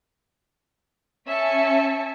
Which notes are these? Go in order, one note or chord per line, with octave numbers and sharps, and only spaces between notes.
C#4 E5 G#5 A5 B6 C#7